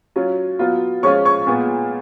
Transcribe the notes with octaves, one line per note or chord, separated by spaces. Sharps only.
F#3 C#4 F4
F#3 B3 F4
F3 G#3 C#4 F4 C#5 C#6
C#5 C#6
A#2 G#3 B3 F4